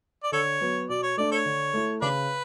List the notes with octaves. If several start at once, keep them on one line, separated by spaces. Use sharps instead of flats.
D5
D3 A4 C#5
F#3 B3
B2 D5
C#5
A3 D4 D5
A4 C#5
D3
A3 E4
C#3 D4 B4